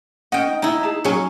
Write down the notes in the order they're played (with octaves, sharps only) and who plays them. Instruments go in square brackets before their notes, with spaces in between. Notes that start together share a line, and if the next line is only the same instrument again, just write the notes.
[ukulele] C#4 F#5 [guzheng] D#5 G5
[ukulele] D#4
[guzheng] D#4 E4 [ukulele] D#5
[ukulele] G#4 A5 A#5
[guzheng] F#3 C#4 [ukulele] G#4